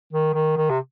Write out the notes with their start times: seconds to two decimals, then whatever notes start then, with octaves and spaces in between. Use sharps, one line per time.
0.13 D#3
0.34 D#3
0.56 D#3
0.70 C3